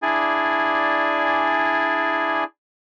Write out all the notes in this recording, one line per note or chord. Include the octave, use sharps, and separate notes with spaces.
D4 E4 G#4 D5 G#5